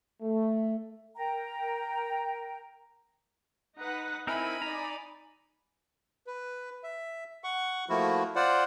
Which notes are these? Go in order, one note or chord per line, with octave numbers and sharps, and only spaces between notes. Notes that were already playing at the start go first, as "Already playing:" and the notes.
A3
A#4 G5 A#5
D#4 B4 F#5
C4 D#4 E4 A#4 G#5 B5
D#4 D5 A#5
B4
E5
F#5 C#6
F3 A3 A#3 E4 F#4
F4 C5 D5 F#5